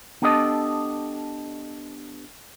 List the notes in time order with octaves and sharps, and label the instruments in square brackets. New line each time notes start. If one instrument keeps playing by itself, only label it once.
[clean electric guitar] B3 D4 G4 A4 D#5